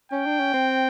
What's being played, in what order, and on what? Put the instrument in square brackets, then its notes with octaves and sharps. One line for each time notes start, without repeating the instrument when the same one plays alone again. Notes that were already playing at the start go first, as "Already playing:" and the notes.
[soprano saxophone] C#4 [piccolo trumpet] G5
[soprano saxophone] D4
C#4
C4